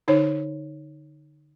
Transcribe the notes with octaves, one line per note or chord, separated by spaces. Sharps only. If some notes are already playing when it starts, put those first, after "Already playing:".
D3 D#4 C5 C#5